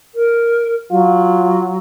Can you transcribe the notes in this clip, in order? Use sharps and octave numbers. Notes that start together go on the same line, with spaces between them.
A#4
F#3 F4